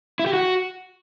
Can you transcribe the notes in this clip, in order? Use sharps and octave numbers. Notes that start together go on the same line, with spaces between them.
E4
G4
F#4